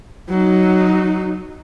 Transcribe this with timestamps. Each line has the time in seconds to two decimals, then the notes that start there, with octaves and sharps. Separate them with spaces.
0.30 F#3 D#4